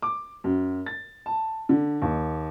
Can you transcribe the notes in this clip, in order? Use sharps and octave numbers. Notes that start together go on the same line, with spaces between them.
D6
F#2
A6
A5
D3
D#2